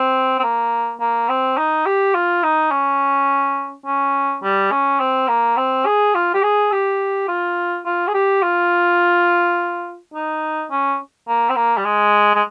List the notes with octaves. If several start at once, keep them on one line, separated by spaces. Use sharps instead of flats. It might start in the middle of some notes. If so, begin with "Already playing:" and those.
Already playing: C4
C4
A#3
A#3
C4
D#4
G4
F4
D#4
C#4
C#4
G3
C#4
C4
A#3
C4
G#4
F4
G4
G#4
G4
F4
F4
G#4
G4
F4
D#4
C#4
A#3
C4
A#3
G3
G#3
G#3